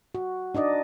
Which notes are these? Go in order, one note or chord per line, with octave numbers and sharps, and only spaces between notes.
F#4
D4 D#4 D5 D#5